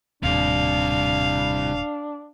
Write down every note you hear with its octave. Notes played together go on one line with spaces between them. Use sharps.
D#1 D#2 A2 C3 G3 D4 F5